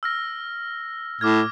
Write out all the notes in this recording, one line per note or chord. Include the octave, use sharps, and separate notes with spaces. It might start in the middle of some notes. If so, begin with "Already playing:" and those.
E6 F6 A#6
A2 D6 F6 G#6